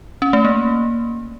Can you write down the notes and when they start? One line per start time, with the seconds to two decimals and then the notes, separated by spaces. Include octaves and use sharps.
0.22 C#4
0.33 A3
0.45 A#3